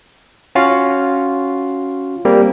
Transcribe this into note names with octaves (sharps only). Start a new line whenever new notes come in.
C#4 F4 F#4 F5
G3 A#3 C4